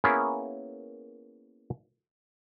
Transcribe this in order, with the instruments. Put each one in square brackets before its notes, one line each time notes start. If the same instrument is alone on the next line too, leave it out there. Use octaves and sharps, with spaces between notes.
[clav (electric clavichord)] A#3 B3 C#4 E4 G#4 A#4